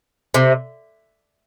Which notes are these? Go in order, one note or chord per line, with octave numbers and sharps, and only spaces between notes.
C3